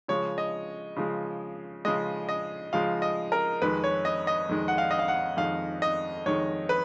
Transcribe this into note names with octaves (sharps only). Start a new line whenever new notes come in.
C#3 F3 G#3 C#5
D#5
C#3 F3 G#3
C#3 F3 G#3 D#5
D#5
C#3 F3 G#3 F5
D#5
A#4
F2 D#3 G#3 B4
C#5
D#5
D#5
F2 D#3 G#3
F#5
F5
D#5
F5
F#5
F2 D#3 G#3 F5
D#5
F2 D#3 G#3 C#5
B4